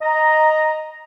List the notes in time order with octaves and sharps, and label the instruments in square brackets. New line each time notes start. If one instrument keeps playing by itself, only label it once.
[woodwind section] D#5 A#5